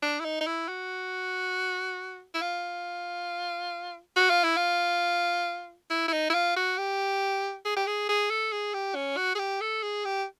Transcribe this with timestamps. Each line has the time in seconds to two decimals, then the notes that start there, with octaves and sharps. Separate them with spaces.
0.02 D4
0.20 E4
0.25 D#4
0.41 D#4
0.46 E4
0.68 F#4
2.34 E4
2.41 F4
4.16 F#4
4.30 F4
4.43 E4
4.56 F4
5.90 E4
6.08 E4
6.13 D#4
6.30 E4
6.34 F4
6.56 F#4
6.78 G4
7.65 G#4
7.76 G4
7.87 G#4
8.09 G#4
8.30 A4
8.52 G#4
8.74 G4
8.95 C#4
9.17 F#4
9.35 G#4
9.39 G4
9.61 A4
9.83 G#4
10.05 G4